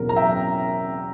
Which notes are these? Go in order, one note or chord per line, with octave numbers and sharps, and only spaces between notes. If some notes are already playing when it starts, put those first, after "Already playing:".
Already playing: E2 B2 F#3 C#4 A#4
A#5
E5 G5